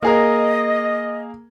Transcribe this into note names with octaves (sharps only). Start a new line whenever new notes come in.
A#3 G#4 A#4 D#5